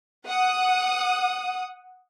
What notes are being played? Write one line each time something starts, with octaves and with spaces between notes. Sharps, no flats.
F#5 D#6